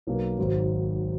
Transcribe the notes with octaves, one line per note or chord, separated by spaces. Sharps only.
B1 B2 A#3
G#1 G#2 F#3